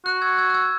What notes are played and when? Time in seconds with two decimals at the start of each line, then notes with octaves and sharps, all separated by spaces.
0.05 F#4 F#6
0.22 E6 G#6
0.38 E6 G#6
0.49 F#6
0.54 E6 G#6